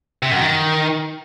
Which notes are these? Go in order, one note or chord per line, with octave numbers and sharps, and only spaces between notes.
C3
F#2
D#3